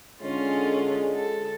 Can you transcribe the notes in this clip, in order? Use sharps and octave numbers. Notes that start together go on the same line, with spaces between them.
D3 G#3 C#4 F4
A4